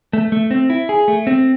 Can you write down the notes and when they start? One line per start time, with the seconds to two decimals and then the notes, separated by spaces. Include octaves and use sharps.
0.13 A3
0.32 A3
0.51 C4
0.70 E4
0.89 G#4
1.08 A3
1.27 C4